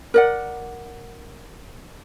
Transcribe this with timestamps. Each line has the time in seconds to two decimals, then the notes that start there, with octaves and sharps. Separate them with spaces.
0.14 A#4 D5 F#5